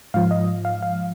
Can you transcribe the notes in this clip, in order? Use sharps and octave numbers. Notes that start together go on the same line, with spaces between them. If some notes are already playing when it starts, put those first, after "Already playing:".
G#2 F3 F5
D#5
F5
F5